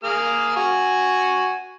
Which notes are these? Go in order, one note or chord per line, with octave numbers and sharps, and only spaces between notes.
A#3 G#4 F6
F#4 G#5 C#6